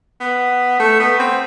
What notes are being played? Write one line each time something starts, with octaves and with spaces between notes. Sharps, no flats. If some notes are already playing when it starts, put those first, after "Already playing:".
B3
A3
B3
C4